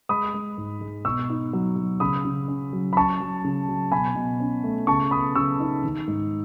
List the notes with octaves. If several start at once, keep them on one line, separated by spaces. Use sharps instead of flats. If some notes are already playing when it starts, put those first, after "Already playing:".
G#3 B5 D#6
G#3
G#2
G#3
B2 C#6 E6
D#4
F#3
F#3
C#3 B5 D#6
C#3
C#4
F#3
B5
C#4 A5 C#6
F#3
C#3
F#3
B2 G#5 B5
B2
C#4
A3
C#3 A5 C#6
B3 B5 D#6
C#3 C#6 E6
D#4
D#3
G#2